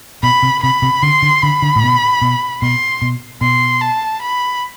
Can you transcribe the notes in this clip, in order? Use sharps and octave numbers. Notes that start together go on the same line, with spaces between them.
B2 B5
C3
C3 B5
C3
D3 C6
D3
D3 B5
D3
A2
B2
B2
B2 C6
B2
B2 C6
A5
B5